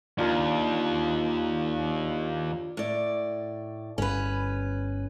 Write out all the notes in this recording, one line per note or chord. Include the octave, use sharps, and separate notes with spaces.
D#2 D4 F4 A#4
A2 D5
G1 C#4 B4